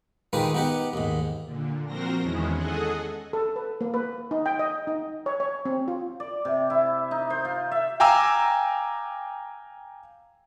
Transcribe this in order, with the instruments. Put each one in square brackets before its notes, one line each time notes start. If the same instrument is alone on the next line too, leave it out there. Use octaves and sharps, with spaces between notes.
[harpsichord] D#3 G#3 D#4 F4 G4 B4
B3 D#4 G4 F#5
D#2 G#2
[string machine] A#2 D3
F3 C4 F#4 A#4 C5 A#6
E2 D#3 G#3 B3 C#4 E4
G#4 A4 D#5 F#5 G#5
[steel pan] A4
B4
A#3
B4
D#4
G5
D#5
D#4
C#5
C#5
C4
F4
[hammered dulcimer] D5
C3
E4
D#4
C5
F4
E5
[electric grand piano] F5 G5 G#5 A#5 D6 E6